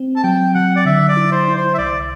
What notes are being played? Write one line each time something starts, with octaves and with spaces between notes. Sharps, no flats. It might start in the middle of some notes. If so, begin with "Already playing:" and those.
Already playing: C4
A5
F#3 G5
F#3 F#5
D5
D3 E5
D5
E4
C5
E4
C5
E5
C2 D5